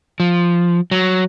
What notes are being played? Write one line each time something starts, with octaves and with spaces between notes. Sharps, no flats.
F3
F#3